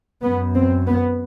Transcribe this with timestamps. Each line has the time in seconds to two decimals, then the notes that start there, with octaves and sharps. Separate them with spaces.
0.22 F#2 B3
0.54 C4
0.87 B3